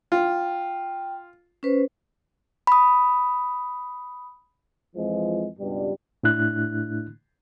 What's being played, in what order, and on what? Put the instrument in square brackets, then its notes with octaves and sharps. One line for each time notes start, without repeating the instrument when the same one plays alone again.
[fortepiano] F4 [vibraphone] G5
[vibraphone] C#4 B4 C5
[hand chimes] B5 D#6
[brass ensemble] F2 E3 F3 G#3
C#2 G2 B2 G3
[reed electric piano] A2 A3 D4 E4 F#6